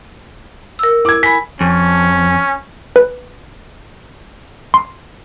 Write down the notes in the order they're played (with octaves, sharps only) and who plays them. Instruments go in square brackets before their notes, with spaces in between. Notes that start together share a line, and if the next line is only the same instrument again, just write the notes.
[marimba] A#4 E6
[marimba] E4 [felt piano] D6 G#6
[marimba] G#5 B5 [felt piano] B6
[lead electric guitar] F2 [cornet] C#4
[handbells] B4
C6